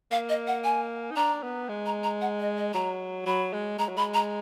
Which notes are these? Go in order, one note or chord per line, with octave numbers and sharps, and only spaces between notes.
A#3 F5
D#5
F#5
G#5
D#4
D4 A#5
B3
G#3
A#5
A#5
F#5
D#5
D#5
F#3 A#5
F#3 B5
G#3
G#3 A#5
F#3
G#3 B5
A#5